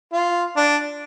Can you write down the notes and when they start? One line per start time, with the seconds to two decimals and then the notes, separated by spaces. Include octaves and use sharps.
0.13 F4
0.57 D4